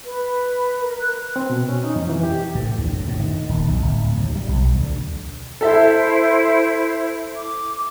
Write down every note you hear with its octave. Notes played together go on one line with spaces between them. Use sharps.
B4
A#4
F#6
C4
B2
C#4
D#4
F2
E3
G4
A2
D2
F#2
A2
D#3
D#1
B1
D1
D#2
G3
B1
D2
E4 A4 C5 E5
D6